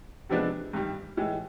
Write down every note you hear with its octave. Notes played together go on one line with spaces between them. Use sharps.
C3 F3 G#3 B3 D4
G2 D#3 G3
A2 E3 G#3